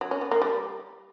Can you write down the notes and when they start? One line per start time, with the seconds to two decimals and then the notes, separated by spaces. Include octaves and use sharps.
0.01 F#3
0.11 C#4
0.21 B3
0.31 A#3
0.42 G3